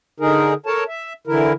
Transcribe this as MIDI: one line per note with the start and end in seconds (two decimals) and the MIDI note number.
0.20 0.54 50
0.20 0.54 63
0.20 0.54 68
0.20 0.54 70
0.66 0.84 69
0.66 0.84 70
0.66 0.84 73
0.66 0.84 81
0.88 1.13 76
1.27 1.53 50
1.27 1.53 52
1.27 1.53 64
1.27 1.53 70